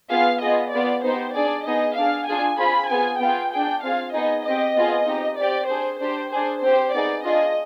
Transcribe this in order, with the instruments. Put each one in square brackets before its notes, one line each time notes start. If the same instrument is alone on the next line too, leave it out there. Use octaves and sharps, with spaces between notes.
[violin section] B3 F4 G#4 F5
B3 F4 G#4 D#5
B3 F4 G#4 D5
B3 D#4 G4 C5
D4 G#4 D5
B3 D#4 G#4 D#5
D4 G#4 F5
D4 F4 G#4 G#5
C4 F4 G#4 B5
B3 F4 G#4 G#5
B3 F4 G#4 G5
D4 G#4 G5
C4 F4 G#4 F5
B3 D#4 G#4 D#5
C4 G4 D#5
B3 F4 G#4
C4 D#4 G4
C4 G4 D5
D4 G#4 C5
D4 G4 C5
D4 G#4 C5
C4 G4 C5
B3 D#4 G#4 D5
D4 F4 G#4 D#5